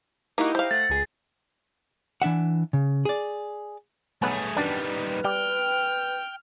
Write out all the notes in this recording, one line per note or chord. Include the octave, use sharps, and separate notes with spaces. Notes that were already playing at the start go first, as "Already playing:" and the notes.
A#3 D#4 E4 F#4 G4
C5 F5
A3 F#5 A6
C#2 G#4 C7
E3 D4 E5 F#5
C#3
G#4 D5
B1 A3 B3 G#4 C#5 G#5
F#2 D#3 G3 D4 G4 B4
G3 G5 F6